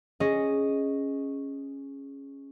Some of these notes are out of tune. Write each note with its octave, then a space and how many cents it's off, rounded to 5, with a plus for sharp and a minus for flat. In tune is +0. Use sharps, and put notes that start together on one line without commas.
C#4 -5 G#4 +0 D#5 +0